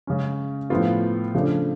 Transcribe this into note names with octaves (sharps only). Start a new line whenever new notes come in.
C#3 G#3 C#4
A2 F3 B3 F4
C#3 F3 A3 D4